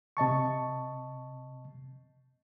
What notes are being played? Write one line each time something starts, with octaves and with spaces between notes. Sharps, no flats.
C3 D#5 A5 C#6